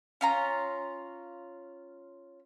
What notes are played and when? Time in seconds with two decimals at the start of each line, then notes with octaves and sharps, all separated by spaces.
0.21 C#4 F4 A#5